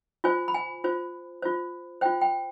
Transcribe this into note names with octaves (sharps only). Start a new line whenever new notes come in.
F4 C5 G#5
B5
G#5
F4 C5
F4 C5
F4 C5 G5
G5